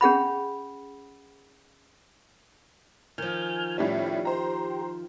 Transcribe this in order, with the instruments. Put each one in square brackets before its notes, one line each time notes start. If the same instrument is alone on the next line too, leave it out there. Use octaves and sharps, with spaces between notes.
[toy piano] C#4 G#4 F#5 B5
[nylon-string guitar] D#3 F3 [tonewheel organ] G#5 F6 G6
[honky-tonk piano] A2 G3 C#4 [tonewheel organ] G4
[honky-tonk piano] C5 A#5